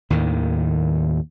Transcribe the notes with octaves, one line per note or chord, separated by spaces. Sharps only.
D#2 A2 D#3